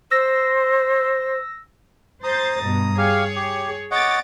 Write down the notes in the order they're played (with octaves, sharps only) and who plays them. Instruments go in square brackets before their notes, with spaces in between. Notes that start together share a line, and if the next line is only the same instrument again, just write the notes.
[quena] C5 [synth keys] E6 A#6
[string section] C5 G6 A6 [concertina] A#5 D#6
[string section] G2 B2
[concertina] G4 F5 G#5 [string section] G#4 C#5
[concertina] G4
[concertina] C#5 D#5 F#5 [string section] D6 A6